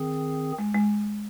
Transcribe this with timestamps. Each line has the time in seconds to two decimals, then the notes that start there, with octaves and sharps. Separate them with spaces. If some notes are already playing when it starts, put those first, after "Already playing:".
Already playing: D#3 C4 G#4
0.59 G#3
0.74 G#3